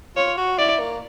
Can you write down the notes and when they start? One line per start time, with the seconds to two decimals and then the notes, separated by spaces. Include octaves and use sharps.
0.16 F4 C#5
0.37 F#4
0.58 E4 D5
0.80 A#3